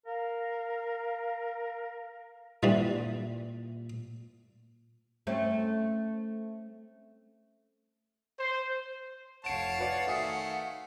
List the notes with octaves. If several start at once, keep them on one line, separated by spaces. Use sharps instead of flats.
A#4 F5
A#2 D3 E3 G3
A3 C4 C#4
C5
F1 C#5 F5 F#5 A5 D7 E7
F#4 B4 D5
D#3 A3 E5 G#5 D#6